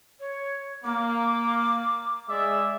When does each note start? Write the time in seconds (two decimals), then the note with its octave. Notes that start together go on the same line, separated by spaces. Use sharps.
0.20 C#5
0.85 A#3 D6
2.29 G#3 D5 E5